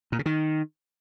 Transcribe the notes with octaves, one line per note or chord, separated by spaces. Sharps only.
A#2
C#3
D#3